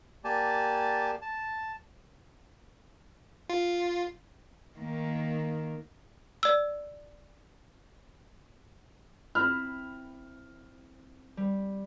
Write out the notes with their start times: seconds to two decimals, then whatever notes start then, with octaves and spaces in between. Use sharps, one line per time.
0.24 A#3 G4 D5 G#5 A5
1.22 A5
3.50 F4
4.78 D#3 A#3
6.43 D5 E6
9.35 C4 E4 B5 F6
11.37 G3